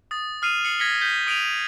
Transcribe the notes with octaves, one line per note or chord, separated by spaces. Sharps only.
D#6 A6
D#6 F6 C7 D#7 F7
C7 C#7 F#7
G#6 A#6 B6 C#7 G7
G6 B6 G7
D#6 D7 D#7 F7